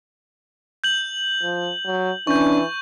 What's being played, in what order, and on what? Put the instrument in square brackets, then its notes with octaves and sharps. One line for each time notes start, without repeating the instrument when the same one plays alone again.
[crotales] G6 F#7
[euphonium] F3
F#3
[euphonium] E3 [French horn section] C#4 D4 [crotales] C#6 G6